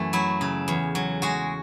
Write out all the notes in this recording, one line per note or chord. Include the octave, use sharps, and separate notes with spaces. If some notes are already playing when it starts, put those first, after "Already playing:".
Already playing: F#2 E3 A3
F#3 E4
C#3
E2
F#3
G#3 F#4